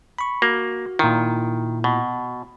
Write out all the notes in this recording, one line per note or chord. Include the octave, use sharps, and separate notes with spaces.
B5 C#6
A#3 F#4
A#2 D#3 E4
B2